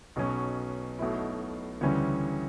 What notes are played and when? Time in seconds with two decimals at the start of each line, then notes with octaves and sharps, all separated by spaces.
0.16 B1 B2 F#3 C#4
0.99 B1 B2 A3 E4
1.81 D2 C#3 E3 G3 C#4